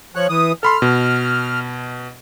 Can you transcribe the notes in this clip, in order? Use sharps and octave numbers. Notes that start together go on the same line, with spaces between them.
F3 C#5 F#6
E3 D#6
A4 B5 C6 F6
B2